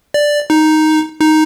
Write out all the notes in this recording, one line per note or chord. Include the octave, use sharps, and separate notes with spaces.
D5
D#4
D#4